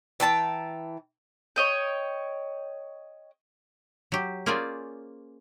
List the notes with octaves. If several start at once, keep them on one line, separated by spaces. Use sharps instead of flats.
E3 G5 A5 A#5
C#5 D#5 G5
F#3 G4
A#3 C#4 F4 G#4 C5 D5